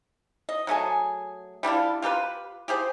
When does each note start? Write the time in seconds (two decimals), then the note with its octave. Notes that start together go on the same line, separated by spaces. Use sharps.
0.49 D#5
0.67 F#3 A3 G#4 G#5
1.63 G3 D4 E4 F4
2.02 F4 G4 A4 B4
2.68 G4 G#4 C5